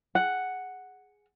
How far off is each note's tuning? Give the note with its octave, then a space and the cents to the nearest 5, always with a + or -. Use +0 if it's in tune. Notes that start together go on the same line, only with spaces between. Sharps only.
G#4 +0 F#5 +0